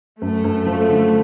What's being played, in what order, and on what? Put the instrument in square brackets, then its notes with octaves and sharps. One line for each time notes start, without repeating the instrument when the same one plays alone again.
[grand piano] F#2 [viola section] A3
[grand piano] F#2
F3
D3